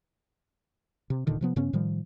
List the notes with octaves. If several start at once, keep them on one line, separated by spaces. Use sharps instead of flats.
C3
D1 A#2 D3 D#3
C3 F3 B3
G2 C#3 B3 C#4
A2 D#3 F3 G3